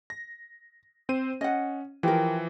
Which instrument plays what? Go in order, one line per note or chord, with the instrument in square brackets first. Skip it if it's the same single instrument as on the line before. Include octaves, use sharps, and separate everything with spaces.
[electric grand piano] A#6
C4 C5 D#7
[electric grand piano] C#4 [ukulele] D#5 F#5
[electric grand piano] E3 F3 [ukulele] G4 A#4